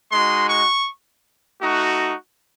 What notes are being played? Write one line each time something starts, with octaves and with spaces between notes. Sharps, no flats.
G#3 D#4 F#4 C6
C#6
A3 D#4 F#4